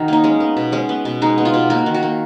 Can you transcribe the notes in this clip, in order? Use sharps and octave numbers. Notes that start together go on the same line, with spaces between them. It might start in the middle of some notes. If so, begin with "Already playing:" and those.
Already playing: D#3 F#4
A#3 D#4
G#3 C#4
B3
B2
G#3 C#4
B3
B2
G#3 D#4
B3
F4
B2
A#3 F#4
D#3
F#4
A#3